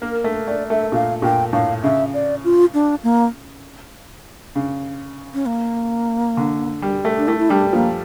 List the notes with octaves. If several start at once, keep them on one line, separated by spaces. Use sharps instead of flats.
A#3 A#4
A3
A3 D5
A3 E5
A#2 F5
A#2 G5
A2 F5
C#3 E5
D5
F4
D4
A#3
C#3
C#4
A#3
D3
G3
A3
D4
A3 E4
E4
G3 D4
F3 A#3